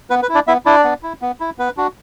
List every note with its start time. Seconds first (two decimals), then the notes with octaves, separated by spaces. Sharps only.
0.10 B3 B4
0.22 B4
0.29 E4
0.35 D4 D5
0.47 B3 E4 E5
0.66 D4 E4 D5
0.84 B3
1.03 E4
1.22 B3
1.40 E4
1.59 B3 B4
1.77 D4 F#4